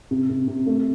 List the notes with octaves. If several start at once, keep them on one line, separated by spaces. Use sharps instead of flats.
C3
C3
C3
A3